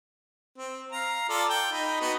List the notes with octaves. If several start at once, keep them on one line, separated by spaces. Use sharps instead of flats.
C4
F5 A#5
F4 A4 D5
G5
D#4 B5
B3 D#4 F#4